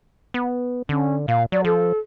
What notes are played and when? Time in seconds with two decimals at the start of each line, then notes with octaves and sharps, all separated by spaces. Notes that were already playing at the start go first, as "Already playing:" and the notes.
0.34 B3
0.89 D3 C#4
1.28 A#2 F5
1.52 F#3 D5
1.65 F3 A4